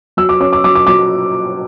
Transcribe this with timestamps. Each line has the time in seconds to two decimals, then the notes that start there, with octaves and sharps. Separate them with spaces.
0.17 F#3 E6
0.29 D6
0.40 C#4 D6
0.53 D6
0.64 F#3 D6
0.75 D6
0.87 F#3 D6